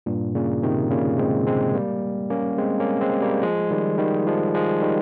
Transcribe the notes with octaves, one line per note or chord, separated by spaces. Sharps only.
G2 A#2
A#2 C#3
C3 D#3
A#2 C#3
G#3 C4
G#3 C4
G3 A#3
A#3 C#4
G#3 C4
A#3 C#4
G#3 C4
G3 A#3
F3 G#3
D#3 G3
D#3 G3
F3 G#3
F3 G#3
D#3 G3